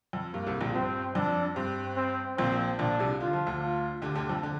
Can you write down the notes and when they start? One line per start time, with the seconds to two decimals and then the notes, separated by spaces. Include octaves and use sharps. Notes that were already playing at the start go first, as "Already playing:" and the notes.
0.13 F2
0.33 G2 A#3
0.47 C2 C3
0.61 A#1 A#2
0.75 G2 C4
1.15 F2 D4
1.56 G2 C4
1.97 C4
2.37 A#1 A#2 C4
2.79 A#1 A#2 D4
2.99 C2 C3
3.20 D3 F4
3.33 F3
3.46 D2 D3
3.61 F4
4.02 D2 D3 G4
4.15 D2 D3
4.29 F2 F3
4.43 D3